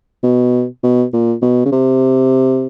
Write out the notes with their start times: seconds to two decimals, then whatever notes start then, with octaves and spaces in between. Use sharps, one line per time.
0.23 B2
0.83 B2
1.13 A#2
1.42 B2
1.65 C#3
1.72 C3